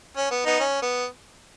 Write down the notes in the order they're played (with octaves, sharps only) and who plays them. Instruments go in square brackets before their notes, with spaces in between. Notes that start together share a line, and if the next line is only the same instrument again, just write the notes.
[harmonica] C#4
B3
B3 D#4
C#4
B3